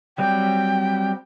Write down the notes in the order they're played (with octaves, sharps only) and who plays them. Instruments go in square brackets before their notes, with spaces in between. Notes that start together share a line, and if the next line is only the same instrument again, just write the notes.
[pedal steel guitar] F#3 G3 C4 [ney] G5